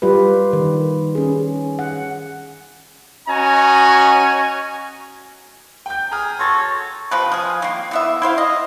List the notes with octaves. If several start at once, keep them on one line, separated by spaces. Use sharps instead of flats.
G3 F4 G4 B4
D#3
C#4 G#4
F#5
C#4 F#4 D#5 G#5 A#5
G5 G6
G#4 G#5 A#5 F6
F#4 A4 C#5 C6 G#6 A6
C3 F3 B4
F3 G#4
D#3 A#3
E3 B3 E5
E4 C5 E5 F5
D#5